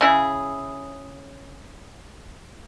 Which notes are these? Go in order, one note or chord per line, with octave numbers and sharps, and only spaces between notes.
C#3 E4 G#4